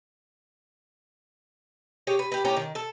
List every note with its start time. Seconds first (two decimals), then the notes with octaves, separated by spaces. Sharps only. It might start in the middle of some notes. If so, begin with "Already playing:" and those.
2.07 G4 G#4 C#5
2.19 B4
2.32 G4 B4
2.45 A2 C#4 G4 A#5
2.56 D#3
2.75 A4